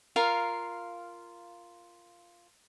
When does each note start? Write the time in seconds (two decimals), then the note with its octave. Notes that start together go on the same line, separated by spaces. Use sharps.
0.16 F4 A#4 F5